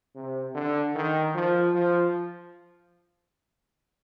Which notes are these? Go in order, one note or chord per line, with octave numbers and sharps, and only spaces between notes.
C3
D3
D#3
F3
F3